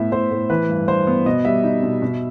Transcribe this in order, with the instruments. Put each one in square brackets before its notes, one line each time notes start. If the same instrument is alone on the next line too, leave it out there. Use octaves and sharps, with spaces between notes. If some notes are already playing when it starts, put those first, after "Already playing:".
Already playing: [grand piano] A2 B3 E5
A2 C5
A2
E3 B4
G2
G2 C5
B3
B2 D#5
G3 E5
D#4
B2
B2